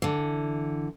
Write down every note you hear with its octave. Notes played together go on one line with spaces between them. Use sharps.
D3 E3